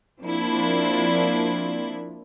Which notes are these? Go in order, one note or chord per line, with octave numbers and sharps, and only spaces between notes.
F3 A#3 C4 D4 E4